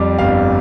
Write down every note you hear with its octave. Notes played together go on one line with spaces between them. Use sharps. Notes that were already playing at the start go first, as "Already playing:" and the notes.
Already playing: F2 G3 D6
G1 F5